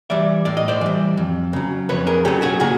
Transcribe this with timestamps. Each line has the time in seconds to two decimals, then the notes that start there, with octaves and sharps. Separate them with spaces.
0.10 E3 G3 D5 E5
0.45 A2 D5
0.57 D#5
0.68 C5 D5
0.81 E3 G3
1.17 F2
1.53 C#3 F#3
1.89 F2 B4 C#5
2.07 G#4 A#4
2.25 C#3 F#3 G4 A4
2.42 F#4 G#4
2.60 A#2 F#4 G#4